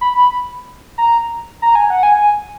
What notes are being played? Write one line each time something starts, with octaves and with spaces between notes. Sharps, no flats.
B5
A#5
A#5
G#5
F#5
G#5